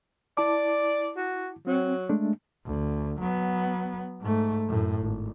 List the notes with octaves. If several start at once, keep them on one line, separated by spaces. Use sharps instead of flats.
E4 D5 A5 D6
F#4
F#3 C4
G#3 A3 D4
D2
F#3 B3
G#2 A3
F#2 A2
G#1